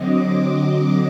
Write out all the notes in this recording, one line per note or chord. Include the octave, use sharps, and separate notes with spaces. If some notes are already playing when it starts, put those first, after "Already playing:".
Already playing: D3 F#3 C4 D#5 D6
D6